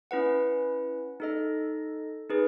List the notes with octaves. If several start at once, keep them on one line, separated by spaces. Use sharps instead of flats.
C#4 E4 B4 F#5
D#4 A4 D#5
D#4 G#4 B4